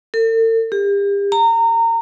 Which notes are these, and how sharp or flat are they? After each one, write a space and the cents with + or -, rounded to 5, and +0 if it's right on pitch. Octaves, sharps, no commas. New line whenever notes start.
A4 +45
G4 +40
A#5 -25